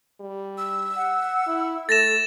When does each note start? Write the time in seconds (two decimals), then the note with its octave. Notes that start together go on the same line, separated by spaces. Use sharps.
0.20 G3
0.58 E6
0.96 F#5
1.47 E4
1.89 A3 A4 A6 A#6 E7